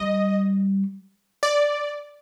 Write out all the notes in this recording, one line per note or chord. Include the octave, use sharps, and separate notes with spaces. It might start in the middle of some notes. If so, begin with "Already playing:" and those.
Already playing: G3 D#5
D5